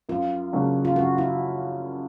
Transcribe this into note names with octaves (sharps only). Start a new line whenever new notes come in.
F#2 F4
C#3 F#3 A#3 D4
F4
F#2 F#4
E4